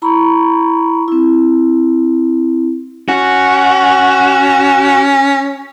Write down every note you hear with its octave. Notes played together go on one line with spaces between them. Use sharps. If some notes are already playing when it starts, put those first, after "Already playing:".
E4 A#5 B5 C#6
C4 E4
C#4 F#4